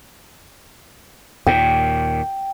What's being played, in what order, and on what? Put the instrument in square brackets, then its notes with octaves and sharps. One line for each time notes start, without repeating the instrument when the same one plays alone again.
[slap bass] D#2 A#2 [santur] G5